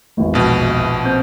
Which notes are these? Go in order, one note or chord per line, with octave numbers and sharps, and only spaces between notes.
G#1 E2
A#1 B2
C4 G6